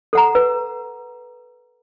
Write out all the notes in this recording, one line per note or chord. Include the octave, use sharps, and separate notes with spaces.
A4 F#5 A#5
B4